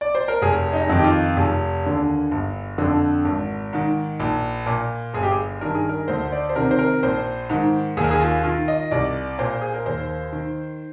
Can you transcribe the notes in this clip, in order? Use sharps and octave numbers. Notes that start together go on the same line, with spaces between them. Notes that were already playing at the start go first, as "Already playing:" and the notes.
D5
C5
A#4
F1 G#4
D#4
F2 D#3
G4
F4
F1 G#4
D#2 D3
G1
F2 D3
G#1
G#2 D#3
A#1
A#2
G1 G#4
G4
G#4
G2 D#3 A#4
G#4
A#4
D2 C5
D5
C5
C3 D#3 A#4
C5
A#4
A#1 C5
G#2 D#3
D#2 G#4
A#4
G#4
F4
D#3 F4
D#5
C2 D5
A#2 C5
G#4
A#4
D#2 C5
D#3